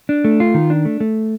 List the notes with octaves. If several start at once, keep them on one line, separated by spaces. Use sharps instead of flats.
D4
A3
F4
D#3
D4
A3
A3